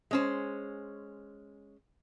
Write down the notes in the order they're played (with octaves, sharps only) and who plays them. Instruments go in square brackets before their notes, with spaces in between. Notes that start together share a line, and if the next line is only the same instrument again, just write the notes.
[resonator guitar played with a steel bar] G#3 C#4 C5